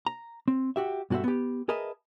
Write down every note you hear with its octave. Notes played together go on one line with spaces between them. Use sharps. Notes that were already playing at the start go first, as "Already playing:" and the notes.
A#5
C4
F#4 G4 E5
G2 B2 F#4 A4 C5 E5
B3 G4
G#4 A#4 B4 D#5 E5 A5